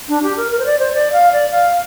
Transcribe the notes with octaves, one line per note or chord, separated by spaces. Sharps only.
D4
G4
A#4
A#4
C5
D5
C5
D5
F5
D5
F5